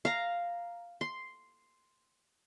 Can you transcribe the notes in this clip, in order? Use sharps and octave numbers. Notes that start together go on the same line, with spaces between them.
F5 A#5
C6